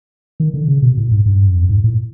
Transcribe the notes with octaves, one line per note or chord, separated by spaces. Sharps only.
D#3
D3
C#3
B2
A2
G#2
G2
F#2
F2
G#2
A2